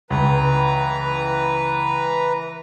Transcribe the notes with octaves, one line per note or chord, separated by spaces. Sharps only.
C#2 E3 B4 A#5